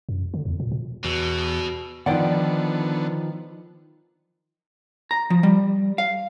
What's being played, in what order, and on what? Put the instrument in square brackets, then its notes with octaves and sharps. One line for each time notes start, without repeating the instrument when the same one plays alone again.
[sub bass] F#2
D3
E2
A#2
A#2
[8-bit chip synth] E2 [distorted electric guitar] B2 [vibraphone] F#4 E6
[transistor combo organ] D3 B3 [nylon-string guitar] D#3 F3 [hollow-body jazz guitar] D5 F#5
[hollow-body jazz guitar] A#5
F3
G3
F5